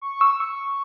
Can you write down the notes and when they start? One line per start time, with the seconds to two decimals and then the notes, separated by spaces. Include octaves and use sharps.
0.01 C#6
0.21 E6
0.40 C#6